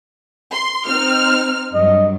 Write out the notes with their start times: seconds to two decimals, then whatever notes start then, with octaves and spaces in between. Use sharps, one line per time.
0.52 C6
0.87 C4 D#4 F6
1.74 G2 F#3 D#5